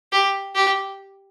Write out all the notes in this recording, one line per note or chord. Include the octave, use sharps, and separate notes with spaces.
G4
G4